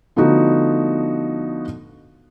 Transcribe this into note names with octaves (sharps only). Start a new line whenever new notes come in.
D3 F3 A3 B3 D#4 F#4